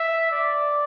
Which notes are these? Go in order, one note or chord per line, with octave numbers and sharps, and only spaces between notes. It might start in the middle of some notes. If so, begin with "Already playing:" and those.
Already playing: E5
D5